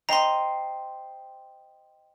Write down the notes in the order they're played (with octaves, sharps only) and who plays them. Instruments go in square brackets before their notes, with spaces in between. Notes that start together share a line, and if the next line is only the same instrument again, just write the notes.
[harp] C5 D#5 G5 [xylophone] A#5 C6